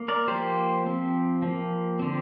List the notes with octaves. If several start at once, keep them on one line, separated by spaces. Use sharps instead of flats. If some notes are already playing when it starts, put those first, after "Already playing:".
Already playing: A#3
A#4 D5
F3 A#3 G4 C5
F3 C4
F3 A#3
D3 F3 C4